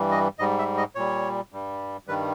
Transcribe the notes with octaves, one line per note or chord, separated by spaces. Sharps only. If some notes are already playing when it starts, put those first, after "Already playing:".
Already playing: G2 E3 G3
D#5
G#2 G3 D#5
E5
D#5
A#2 G3 C#5
G2 G3
G2 D#3 G3 B4